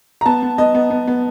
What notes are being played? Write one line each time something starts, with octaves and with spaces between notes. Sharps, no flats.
A#5
B3 A5
B3
B3 D#5
B3
B3
B3